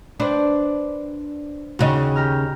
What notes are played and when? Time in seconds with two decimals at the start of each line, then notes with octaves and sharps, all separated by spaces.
0.20 D4 B4 C5 D5
1.79 D#2 C#3 F#4 C#5 D#5
2.16 G4 A#5 F6